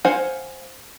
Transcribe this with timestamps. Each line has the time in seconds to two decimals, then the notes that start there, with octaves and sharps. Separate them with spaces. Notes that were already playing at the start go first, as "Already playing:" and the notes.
0.05 C5 F5 F#5 G#5